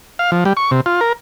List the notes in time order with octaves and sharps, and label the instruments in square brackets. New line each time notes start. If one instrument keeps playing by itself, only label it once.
[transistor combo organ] F5
F3
G3
C#6
C3
F4
A#4